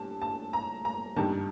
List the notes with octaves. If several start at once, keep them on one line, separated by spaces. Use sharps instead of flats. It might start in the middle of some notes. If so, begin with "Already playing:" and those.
Already playing: G2 A5
A5
A#5
A#5
G2 D#3 A5